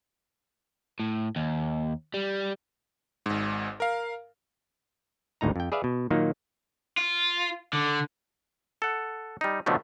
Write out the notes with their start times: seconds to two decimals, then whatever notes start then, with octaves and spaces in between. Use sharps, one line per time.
1.00 A2
1.36 D#2
2.14 G3
3.26 G#1 G#2
3.80 A#4 F5
5.41 G#1 D2 A2 D#4 A#5
5.56 F2 G5
5.72 G#4 B4 D5 E5 F5
5.84 B2
6.10 A#2 D#3 F#3 A#3 D#4
6.97 F4
7.73 D3
8.82 A4 F#5
9.41 G3 D#4
9.66 B2 D3 D#3 F3 F#3 A3